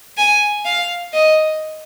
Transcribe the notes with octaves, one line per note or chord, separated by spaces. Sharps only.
G#5
F5
D#5